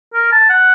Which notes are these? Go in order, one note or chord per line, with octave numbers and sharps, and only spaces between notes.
A#4
A5
F#5